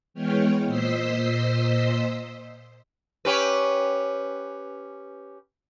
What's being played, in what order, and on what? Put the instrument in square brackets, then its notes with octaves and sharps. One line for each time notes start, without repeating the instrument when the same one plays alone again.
[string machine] E3 G#3 B3 C#5 G5 F6
A#2 C5 D#5 E6 B6 C7
[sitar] C#4 G4 B4